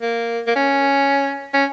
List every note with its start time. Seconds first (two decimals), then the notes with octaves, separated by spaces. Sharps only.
0.01 A#3
0.47 A#3
0.56 C#4
1.54 C#4